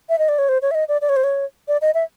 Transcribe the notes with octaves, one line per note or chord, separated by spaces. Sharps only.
E5
D#5
D5
C#5
C5
C#5
E5
D#5
D5
D5
C#5
C5
C#5
D5
D#5
E5